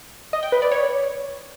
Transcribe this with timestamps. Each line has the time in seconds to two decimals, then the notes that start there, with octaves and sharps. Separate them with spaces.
0.33 D#5
0.43 G5
0.52 B4
0.62 D5
0.72 C#5